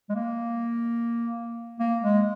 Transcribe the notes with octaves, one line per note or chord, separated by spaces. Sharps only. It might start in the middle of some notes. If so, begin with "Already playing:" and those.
G#3
A#3
A#3
G#3